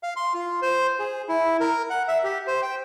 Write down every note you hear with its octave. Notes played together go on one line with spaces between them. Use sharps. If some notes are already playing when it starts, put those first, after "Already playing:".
F5
C6
F4
C5
G#4
E4
A#4
F#5
E5
G4
C5
G5